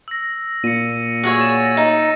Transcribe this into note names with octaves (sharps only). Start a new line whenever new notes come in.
E6 A#6
A#2 C#7 D#7
F#4 G#4 C#5 E6 A#6 D#7
A6 E7
A#6
D#4